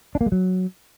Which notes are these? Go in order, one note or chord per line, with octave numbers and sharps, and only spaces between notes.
D4
A#3
G#3
F#3